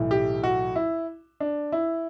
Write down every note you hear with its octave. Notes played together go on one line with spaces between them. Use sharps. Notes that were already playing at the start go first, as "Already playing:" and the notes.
Already playing: B1 A2 E3
G4
F#4
E4
D4
E4